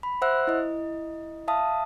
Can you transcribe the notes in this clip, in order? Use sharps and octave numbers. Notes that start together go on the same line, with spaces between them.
B5
C5 E5 F#5 E6 F#6
E4 D#5
E5 F5 A5 D#6